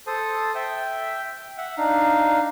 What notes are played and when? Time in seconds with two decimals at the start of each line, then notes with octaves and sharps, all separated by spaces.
0.07 A4 C5 A5 D#6
0.55 E5 G5
1.58 E5 F#5
1.77 D4 D#4 F5